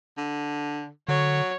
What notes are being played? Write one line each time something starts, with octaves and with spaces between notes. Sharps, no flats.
D3
D3 F#3 C#5